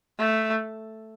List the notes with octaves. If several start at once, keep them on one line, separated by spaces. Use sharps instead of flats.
A3